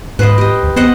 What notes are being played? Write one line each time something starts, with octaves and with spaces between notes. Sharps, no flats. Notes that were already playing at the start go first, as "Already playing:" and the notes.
G#2 B4 C5 D#5
G4 D#5
D2
B3 C5 D#5 F#5